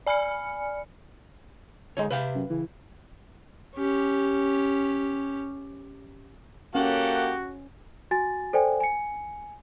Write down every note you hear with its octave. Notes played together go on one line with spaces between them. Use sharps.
D5 G#5 B5 F6 C#7
D3 G#3 D#4 C#5
C3 B4 F5 G5
F#2
C#3 E3
C#4 G4
A#3 C#4 F#4 G4 A4 F#5
F#4 G#5 A6
A4 C5 D5 G5 G#5
G#5 C#7